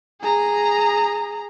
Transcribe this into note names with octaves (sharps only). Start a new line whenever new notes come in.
G#4 A#5